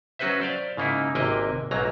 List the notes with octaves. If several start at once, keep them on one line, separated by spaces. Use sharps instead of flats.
F#3 C#4 F#4 B4 C5 E5
C5 D5 F5
G#2 C#3 A#3 D#4 E4
G#1 C3 A#3 D#5 G5 G#5
B1 G#2 F#3 A#3 A#5